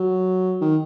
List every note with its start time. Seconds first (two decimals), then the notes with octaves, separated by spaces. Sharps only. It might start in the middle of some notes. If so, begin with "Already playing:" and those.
Already playing: F#3
0.61 D#3